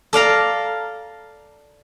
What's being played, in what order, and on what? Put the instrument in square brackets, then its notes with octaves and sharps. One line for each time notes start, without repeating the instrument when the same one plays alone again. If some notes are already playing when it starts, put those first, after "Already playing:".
[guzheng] A4 D5 F5 A#5